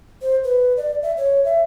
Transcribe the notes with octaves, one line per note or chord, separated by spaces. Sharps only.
C5
B4
D5
E5
C#5
E5